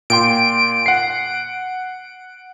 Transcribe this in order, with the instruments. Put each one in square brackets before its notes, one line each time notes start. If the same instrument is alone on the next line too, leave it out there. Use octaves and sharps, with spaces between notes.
[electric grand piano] A#2 G5 C6 [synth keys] D7
[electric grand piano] F#5 C7